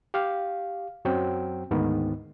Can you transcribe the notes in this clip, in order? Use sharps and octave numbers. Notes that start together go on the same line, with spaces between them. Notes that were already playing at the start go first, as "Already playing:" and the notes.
G4 F5
F#2 F#3 C4 G5
D2 G#2 D#3 B3